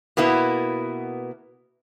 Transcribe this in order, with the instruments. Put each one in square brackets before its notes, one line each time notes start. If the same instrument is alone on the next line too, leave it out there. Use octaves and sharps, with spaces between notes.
[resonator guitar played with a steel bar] B2 A#3 B3 E4